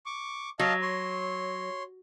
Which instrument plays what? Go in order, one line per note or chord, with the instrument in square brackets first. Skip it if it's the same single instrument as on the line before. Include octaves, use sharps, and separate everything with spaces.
[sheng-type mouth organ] C#6 D6
[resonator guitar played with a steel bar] F#3 [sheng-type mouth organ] D#5 F5 A5
[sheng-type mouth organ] C#5 C6